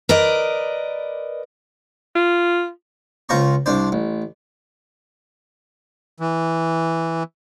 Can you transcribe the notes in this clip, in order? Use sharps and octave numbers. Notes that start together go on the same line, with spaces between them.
A#4 B4 D5 D#5
F4
C#2 F4 C5 A#5 C#6
C2 D4 C5
A1
E3